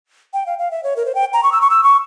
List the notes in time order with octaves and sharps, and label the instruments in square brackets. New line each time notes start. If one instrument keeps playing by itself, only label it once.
[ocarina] G5
F5
F5
E5
C#5
A#4
C5
G5
A#5
C#6
E6
C#6
E6
C#6